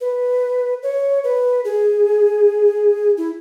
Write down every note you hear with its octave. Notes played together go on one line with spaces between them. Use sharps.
B4
C#5
B4
G#4
E4